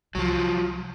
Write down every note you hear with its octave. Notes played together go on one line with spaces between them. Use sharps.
C2 F3 F#3